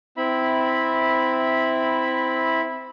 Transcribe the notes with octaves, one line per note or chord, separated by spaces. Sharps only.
C4 E4 E5 B5